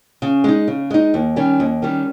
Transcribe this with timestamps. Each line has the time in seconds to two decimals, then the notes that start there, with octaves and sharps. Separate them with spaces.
0.22 C#3
0.44 G#3 D#4
0.68 C#3
0.90 G#3 D#4
1.14 D#2
1.36 D#3 G3 C#4
1.60 D#2
1.82 D#3 G3 C#4